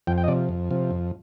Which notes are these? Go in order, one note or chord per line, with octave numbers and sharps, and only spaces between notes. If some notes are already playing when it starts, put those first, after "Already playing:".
F2 G5
G5
D#5
C3 F3 D5
F2
C3 F3
F2